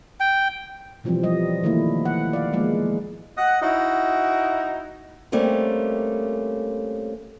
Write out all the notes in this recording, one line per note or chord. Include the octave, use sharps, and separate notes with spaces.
G5
B2 E3 F3 G3 C4
F3 G3 D#5
D#3 E3 A3 A#3 E4
F#5
D5 F5
F3 G#3 A#3 B3
D#5 F#5
D#4 E4 F#4
G3 A3 A#3 C4 C#4